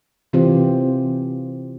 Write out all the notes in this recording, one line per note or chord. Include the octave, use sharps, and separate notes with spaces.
C3 E3 C4 F4 G4 C5